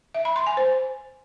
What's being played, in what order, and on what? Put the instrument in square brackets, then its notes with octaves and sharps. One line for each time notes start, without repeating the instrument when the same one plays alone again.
[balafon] E5
B5
C6
G#5
C5